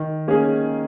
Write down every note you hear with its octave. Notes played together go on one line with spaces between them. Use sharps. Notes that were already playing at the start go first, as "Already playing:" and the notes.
Already playing: D#3
A#3 C#4 G#4